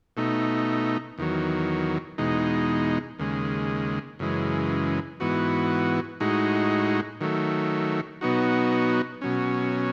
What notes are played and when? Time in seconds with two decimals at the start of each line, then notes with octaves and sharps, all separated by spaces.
0.17 B2 A3 D#4
1.18 E2 D#3 F#3
2.18 E2 B2 G#3 D#4
3.19 D#2 C#3 G#3
4.19 F#2 C#3 E3 G#3
5.20 G#2 E3 B3 F#4
6.20 A2 G#3 D#4 F#4
7.21 D#3 F#3 A3
8.21 B2 F#3 B3 D#4 F#4
9.21 B2 F#3 C#4